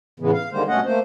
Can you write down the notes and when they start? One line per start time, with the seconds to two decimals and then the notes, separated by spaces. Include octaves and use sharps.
0.20 A2 C#3 E3 G#3 B3
0.33 F5
0.52 D3 D#3 G3 G#3 A#3 C5
0.68 G2 B2 A3 C#4 D#5 F#5
0.85 A3 A#3 C5